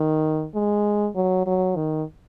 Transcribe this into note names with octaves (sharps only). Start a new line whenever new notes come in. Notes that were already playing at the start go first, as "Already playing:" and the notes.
Already playing: D#3
G#3
F#3
F#3
D#3